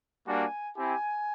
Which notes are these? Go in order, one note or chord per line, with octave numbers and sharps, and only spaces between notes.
G3 A#3 D4 F#4 G#5
C4 E4 G4 G#5